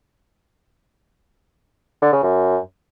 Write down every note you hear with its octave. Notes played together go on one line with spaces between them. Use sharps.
D3
C#3
F#2